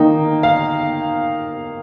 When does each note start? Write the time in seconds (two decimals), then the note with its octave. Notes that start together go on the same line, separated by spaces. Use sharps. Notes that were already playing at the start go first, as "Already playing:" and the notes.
Already playing: D#3 A#3 D#4 G5
0.43 F5